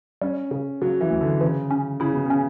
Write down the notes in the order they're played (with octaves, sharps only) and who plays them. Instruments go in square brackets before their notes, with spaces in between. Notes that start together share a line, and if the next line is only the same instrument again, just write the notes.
[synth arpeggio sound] G3 [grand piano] C#4
[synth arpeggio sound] C#3
[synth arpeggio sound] C#3 [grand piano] F#3
[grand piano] E3
[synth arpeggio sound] D2
[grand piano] D3
[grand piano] C#3 [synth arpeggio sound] E3
[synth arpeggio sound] C#4
[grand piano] C#3 [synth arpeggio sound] E4
[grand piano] B2
[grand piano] C#3 [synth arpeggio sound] C#4